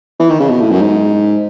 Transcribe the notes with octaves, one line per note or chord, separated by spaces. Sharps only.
E3
D#3
C#3
B2
A2
F#2
G#2